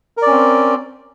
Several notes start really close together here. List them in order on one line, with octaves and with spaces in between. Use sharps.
A#4 D5 C#4 C4